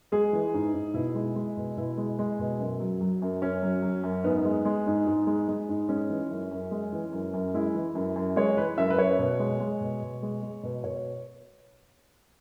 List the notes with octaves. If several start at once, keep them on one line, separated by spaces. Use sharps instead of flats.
G#3 G#4
E3
G#2
G#2
B2 E4
G#3
G#3
B2
B2 E4
G#3
G#3
B2
F#2
F#3
F#3
F#2
F#2 C#4
F#3
F#3
F#2
G#2 B3
G#3
G#3
G#2
G#2
G#3
G#3
G#2
G#3 C#4
E3
F#2
F#2
G#3
E3
F#2
F#2
G#3 E4
E3
F#2
F#2
G#3 C#5
E3 B4
F#2 E5
B4
F#2 C#5
B2
G#3
G#3
B2
B2
G#3
G#3
B2
B2 C#5